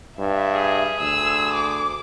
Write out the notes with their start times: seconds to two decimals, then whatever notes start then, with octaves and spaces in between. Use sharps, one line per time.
0.19 G2 E5
0.55 G#4
1.01 D2 E6
1.54 D6